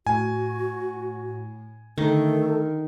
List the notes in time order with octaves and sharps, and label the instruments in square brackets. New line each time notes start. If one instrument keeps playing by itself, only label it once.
[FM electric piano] A2 [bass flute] F#4 [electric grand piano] G#5
[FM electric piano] D3 A#4 [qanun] D#3 [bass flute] A3